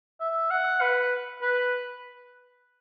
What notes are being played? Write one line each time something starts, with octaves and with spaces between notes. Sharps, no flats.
E5
F#5
B4
B4